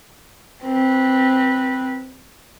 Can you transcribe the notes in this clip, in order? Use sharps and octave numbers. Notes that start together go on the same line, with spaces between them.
C4 B4